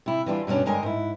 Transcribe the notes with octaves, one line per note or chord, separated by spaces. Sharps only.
C3 E4
E3 G3 D4 F4
G2 B2 A#3 C#4 D4
G2 D3 G#3 A#4 D#5 G#5
G#2 E4